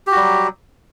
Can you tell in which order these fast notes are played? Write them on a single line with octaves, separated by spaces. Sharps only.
G4 F#4 G3 F#3